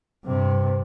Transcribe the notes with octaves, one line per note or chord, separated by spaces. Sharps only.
G2 C3